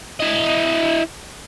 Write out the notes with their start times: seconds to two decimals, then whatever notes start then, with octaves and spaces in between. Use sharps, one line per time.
0.20 E4 D#5